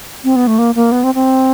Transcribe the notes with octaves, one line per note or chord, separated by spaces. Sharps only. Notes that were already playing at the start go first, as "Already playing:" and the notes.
C4
B3
A3
A#3
A#3
B3
C4
C4